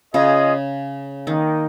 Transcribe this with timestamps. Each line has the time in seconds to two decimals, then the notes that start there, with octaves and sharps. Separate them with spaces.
0.13 C#3 F4 G#4 D#5
1.27 D#3 A#3 D#4 A#4 D#5 G5